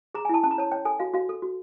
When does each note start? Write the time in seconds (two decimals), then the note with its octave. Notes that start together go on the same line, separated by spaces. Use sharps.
0.14 G#4 A#5
0.25 G#5
0.29 E4 A5
0.43 C#4 A5
0.51 A#5
0.58 C#5 A5
0.72 C#5 G5
0.85 A4 G#5
1.00 F#4 F5
1.14 F#4 F5
1.29 A4
1.42 F#4